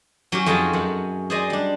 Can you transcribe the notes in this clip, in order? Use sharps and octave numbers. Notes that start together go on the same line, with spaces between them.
F#3 C#4 G4
F2 F#4 G#4 D#5 G5 A5
F#2 F#5
G#4 C5 D5 D#5 G#5
G3 D4